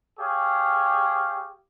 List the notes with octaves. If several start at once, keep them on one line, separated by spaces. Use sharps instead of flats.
G4 G#4 C#5 F5